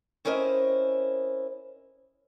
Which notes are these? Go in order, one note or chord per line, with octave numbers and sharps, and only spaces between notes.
C4 C#4 E4 A#4 C5 D#5